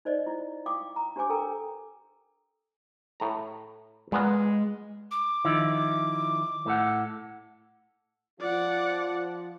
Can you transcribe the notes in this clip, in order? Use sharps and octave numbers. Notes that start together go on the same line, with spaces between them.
D#4 C5 D5 D#5
E4
E4 F5 G5 D6 D#6
A#5
D4 G4 C5 C#5 G#5 D6
A4 A#4 G5 A#5
A2 A#5
A#2 G#3 B3 A#4
D6
D#3 F3 E4
A2 A4 F#5
F3 F4 D5 F#5